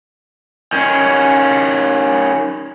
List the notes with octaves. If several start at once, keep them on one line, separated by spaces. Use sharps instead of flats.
D#3 C#4